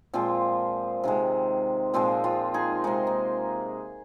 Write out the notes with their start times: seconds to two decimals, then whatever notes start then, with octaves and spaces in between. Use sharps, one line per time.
0.13 A#2 F3 G#3 C4 F4
1.04 C3 D#3 G#3
1.94 A#2 F3 G#3 C4 F4
2.24 C4 F4
2.54 D#4 G#4
2.84 C3 G#3 D#4 G#4
3.07 A#3